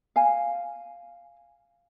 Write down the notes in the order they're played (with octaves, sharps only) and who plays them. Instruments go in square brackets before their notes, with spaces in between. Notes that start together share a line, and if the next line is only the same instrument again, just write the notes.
[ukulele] F5 G#5